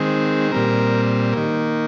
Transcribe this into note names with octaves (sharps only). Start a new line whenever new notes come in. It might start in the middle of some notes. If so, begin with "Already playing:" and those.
Already playing: D#3 G#3 C4
A#2 G3 C4 A#4
D#3 A#3